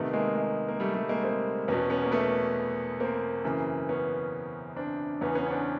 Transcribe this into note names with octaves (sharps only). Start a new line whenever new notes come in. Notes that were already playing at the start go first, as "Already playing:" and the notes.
Already playing: C2 C3 D#3 A3 B3
G#3 A#3
G#3
A#3
G3 A3
G3 A3
G#3 A#3
A#3 C4
E2 B2 B3 C#4
B3 C#4
A#3
A3 B3
A#3 C4
F#2 C#3 E3
B3 C#4
C4 D4
E2 C#3 E3 B3 C#4
B3 C#4
C#4
C4 D4